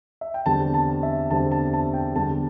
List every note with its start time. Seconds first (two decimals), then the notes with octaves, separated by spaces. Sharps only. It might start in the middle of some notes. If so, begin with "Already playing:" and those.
0.21 E5
0.34 G5
0.46 E2 D3 G3 C4 A5
0.74 A5
1.03 E5
1.30 E2 D3 G3 C4 A5
1.52 A5
1.74 A5
1.94 G5
2.15 E2 D3 G3 A5